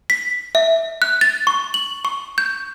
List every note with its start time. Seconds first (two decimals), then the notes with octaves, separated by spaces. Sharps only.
0.10 B6
0.55 E5
1.02 F#6
1.21 A6
1.47 C#6
1.74 F#7
2.05 C#6
2.38 G6